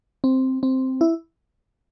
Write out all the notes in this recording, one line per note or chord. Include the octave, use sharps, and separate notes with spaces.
C4
C4
E4